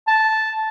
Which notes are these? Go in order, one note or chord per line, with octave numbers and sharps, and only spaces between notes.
A5